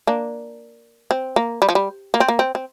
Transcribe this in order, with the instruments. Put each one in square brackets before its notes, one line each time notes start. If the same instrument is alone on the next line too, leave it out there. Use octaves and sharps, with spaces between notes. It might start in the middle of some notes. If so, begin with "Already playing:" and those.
[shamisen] A#3 D4
C4
A#3
G3
F3
G3
A#3
C4
A#3
C4
C4